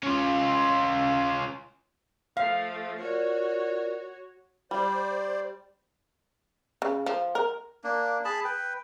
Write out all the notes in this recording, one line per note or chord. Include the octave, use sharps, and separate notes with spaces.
C#4 F4
F3 A3 F5
F4 F#4 A#4 C#5 D5
G3 C5 D5
C#3
F3
A#4
A#3 D4
G#4 A5 B5
B4 G5